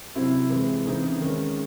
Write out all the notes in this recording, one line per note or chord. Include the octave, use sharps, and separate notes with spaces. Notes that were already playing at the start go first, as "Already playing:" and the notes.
C3 F#3 C4 E4
E3 G#3 C4
C#3 E3 C4 D#4
D#3 G#3 C#4